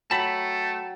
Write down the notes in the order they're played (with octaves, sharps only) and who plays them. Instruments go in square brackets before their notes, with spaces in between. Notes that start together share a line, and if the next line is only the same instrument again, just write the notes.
[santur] F#3 G5 [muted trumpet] A3 [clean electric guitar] A5 B5